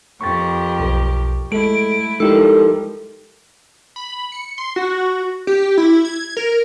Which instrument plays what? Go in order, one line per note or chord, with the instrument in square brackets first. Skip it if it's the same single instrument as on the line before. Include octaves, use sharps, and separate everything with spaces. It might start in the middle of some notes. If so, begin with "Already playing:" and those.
[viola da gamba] F2 G4 A#4 [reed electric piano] C#6 A6
[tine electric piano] B1
[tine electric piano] G#3 A4 [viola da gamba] A3 E4 [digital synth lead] D7
[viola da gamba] F3 G3 [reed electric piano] G#3 E4 [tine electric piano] D#4 G4 A#4 [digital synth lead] A4
[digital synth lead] B5
C#7
C6
F#4
G4
E4
G#6
A#4